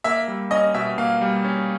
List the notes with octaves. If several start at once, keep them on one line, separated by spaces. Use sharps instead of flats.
A#3 E5
G3
C#4 D#5
B2 E5
A#3 F5
G3
C#4